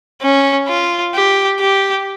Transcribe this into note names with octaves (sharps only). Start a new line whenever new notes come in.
C#4
F4
G4
G4